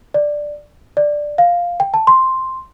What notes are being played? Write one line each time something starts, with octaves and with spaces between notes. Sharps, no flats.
D5
D5
F5
G5
A5
C6